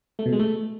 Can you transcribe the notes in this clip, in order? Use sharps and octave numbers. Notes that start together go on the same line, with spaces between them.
A3
B2
G#3
A3